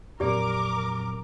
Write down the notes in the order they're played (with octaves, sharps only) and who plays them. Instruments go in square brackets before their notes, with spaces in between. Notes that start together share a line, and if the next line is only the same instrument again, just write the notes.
[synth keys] F2 A#2 F#3 [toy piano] G4 D5 [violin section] A#4 D6